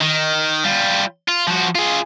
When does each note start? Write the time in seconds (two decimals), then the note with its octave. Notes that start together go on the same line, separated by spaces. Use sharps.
0.01 D#3
0.64 G3 F4
1.28 F4
1.47 F3 F#4
1.75 F4 G#4